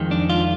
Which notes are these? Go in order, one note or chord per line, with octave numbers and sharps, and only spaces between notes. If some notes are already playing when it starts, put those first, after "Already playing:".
Already playing: F2 D#3 G#3
D4
F4